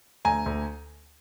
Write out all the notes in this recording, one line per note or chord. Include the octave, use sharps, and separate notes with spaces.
D2 G#5 A#5
D2